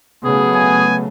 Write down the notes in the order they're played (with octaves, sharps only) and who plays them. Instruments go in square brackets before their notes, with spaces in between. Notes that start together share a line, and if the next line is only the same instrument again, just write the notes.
[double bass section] C#3 F#3 A3 [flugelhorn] B3 [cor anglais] G#4
[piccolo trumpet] G#5